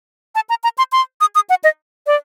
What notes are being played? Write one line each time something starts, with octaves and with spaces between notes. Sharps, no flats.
A5
A#5
A#5
C6
C6
D#6
D#6
F#5
D#5
D5